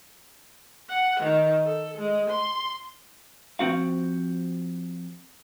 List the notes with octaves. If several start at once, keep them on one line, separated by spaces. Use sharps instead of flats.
F#5
D#3
A4
G#3
C6
F3 C4 F#4 F5